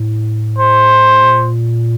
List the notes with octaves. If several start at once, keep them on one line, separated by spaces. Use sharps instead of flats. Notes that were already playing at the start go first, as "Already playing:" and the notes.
Already playing: A2
C5
A#2